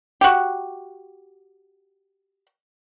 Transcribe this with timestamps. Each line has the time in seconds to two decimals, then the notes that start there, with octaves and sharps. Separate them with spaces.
0.21 F#4 G4